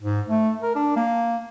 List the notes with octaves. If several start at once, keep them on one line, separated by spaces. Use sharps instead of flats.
G#2
A3
A#4
D4
A#3